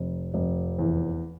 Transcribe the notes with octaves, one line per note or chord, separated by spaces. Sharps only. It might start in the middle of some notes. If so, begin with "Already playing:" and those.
Already playing: F1
F1
E2